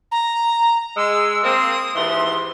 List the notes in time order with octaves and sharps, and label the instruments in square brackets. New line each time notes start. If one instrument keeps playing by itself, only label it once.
[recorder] A#5
[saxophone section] G#3 [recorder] E6
[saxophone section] A#3 C4 [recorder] D#6
[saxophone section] D#2 G#2 E3 [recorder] C6